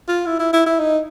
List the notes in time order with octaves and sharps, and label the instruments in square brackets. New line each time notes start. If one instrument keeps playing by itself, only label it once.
[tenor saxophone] F4
E4
E4
E4
E4
D#4